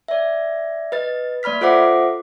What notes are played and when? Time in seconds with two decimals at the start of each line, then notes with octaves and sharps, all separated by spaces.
0.08 D5 E5
0.92 B4 D#5 A6
1.43 A#3 D5 B5 F6 B6
1.61 F4 A4 C5 E5 F#5 D6